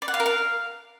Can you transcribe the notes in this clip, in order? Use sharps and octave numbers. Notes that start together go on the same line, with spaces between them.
D5
F#5
F5
A#4
F5